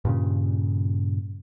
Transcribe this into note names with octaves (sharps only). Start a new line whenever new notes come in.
G2 A#2 C#3